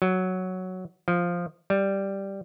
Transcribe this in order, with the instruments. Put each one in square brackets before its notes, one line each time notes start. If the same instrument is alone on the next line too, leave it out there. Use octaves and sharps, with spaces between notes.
[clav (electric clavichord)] F#3
F3
G3